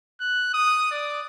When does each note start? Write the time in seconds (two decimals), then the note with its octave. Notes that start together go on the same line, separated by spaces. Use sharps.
0.20 F#6
0.54 D#6
0.91 D5